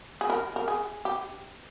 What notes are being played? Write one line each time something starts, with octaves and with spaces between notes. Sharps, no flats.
G#4
A#4
A#4
G#4
G4